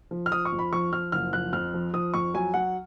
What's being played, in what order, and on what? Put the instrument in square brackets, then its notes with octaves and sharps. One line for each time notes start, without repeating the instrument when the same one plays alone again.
[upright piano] F3
F6
F3 D#6
C#6
F2
B5
F3 C#6
F3 F6
F#1 F6
F3 F#6
F2 F6
F3
F3 D#6
F2 C#6
F#3 G#5
F#3 F#5